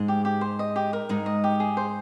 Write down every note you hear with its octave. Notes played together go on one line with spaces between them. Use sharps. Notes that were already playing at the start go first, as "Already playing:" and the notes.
Already playing: G#2 G#3
G4
G4
C5
D#5
G4
A#4
G#2 G#3 D#4
D#5
G4
G#4
C5